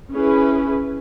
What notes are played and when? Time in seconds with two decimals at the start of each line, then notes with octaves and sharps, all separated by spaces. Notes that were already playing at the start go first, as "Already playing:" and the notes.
0.10 C#4 E4 G#4 B4